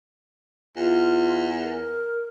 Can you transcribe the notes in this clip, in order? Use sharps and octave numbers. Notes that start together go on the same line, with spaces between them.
E2 F4
A#4